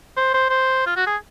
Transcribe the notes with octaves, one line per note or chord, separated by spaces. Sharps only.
C5
C5
C5
F4
F#4
G#4